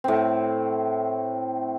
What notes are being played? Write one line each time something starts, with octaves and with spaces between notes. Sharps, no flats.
A2 C4